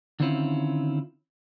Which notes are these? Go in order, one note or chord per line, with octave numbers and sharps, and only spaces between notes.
D3 D#3 C4 C#4 E4 F4